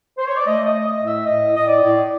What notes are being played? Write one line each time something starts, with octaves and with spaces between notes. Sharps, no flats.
C5
C#5
D5
A3 D#5
D#5
A3
D#5
A2
E5
A2 D#5
A2 D#5
D5
A2